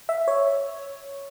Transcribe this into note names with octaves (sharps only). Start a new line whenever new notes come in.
E5
C#5